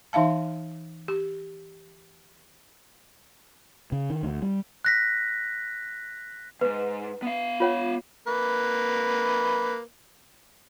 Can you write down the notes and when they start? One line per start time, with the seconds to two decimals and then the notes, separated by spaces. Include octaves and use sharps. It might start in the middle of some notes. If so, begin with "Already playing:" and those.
0.13 E3 D#4 E5 F5 A5
1.08 G4
3.92 C#3
4.10 D#3
4.23 D2
4.42 G3
4.85 F#6 A#6 B6
6.61 D#2 G#2 B4
7.23 B3 F5
7.60 F4 C#5 F#5
8.27 A#3 B4